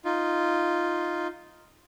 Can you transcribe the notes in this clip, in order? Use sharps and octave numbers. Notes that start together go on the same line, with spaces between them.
D#4 F4